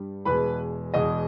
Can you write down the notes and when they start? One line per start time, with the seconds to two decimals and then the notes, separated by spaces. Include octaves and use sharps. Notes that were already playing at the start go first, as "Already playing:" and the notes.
Already playing: G2 G3
0.25 E2 B2 G#3 B4 B5
0.94 E2 B2 G#3 D#5 D#6